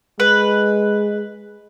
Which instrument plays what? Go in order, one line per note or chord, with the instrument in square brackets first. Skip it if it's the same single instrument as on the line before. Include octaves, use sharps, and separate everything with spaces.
[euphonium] G#3 [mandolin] B4